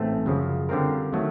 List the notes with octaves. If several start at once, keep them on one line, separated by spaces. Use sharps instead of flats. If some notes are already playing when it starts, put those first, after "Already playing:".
Already playing: A1 G#2 A3 C4
F#2 C#3 F3
D3 G3 C4 F4 A#4
D#3 F#3 A3